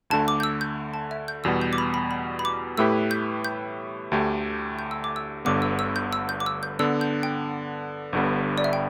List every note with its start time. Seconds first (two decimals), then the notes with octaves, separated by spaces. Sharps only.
0.10 D2 D3 A3 A5
0.28 D6
0.40 G6
0.43 E6
0.61 G6
0.94 A5
1.11 E5
1.28 G6
1.44 E2 B2 G3 B3 E6
1.62 G6
1.73 D6
1.78 B5
1.94 B5
2.11 B5
2.39 B5
2.45 D6
2.77 A2 A3 E4 G4 B4 E6
3.11 G6
3.45 G6
4.12 D2 D3 A3 G4
4.79 G6
4.91 E6
5.04 D6
5.16 E6
5.45 G1 G2 D3 B3 D6
5.62 E6
5.79 E6
5.96 G6
6.13 E6
6.29 G6
6.40 D6
6.46 E6
6.63 G6
6.79 D3 B3 D4 E6
7.01 G6
7.23 G5
8.13 G1 G2 D3 G3 B3
8.58 D5
8.64 E5
8.73 G5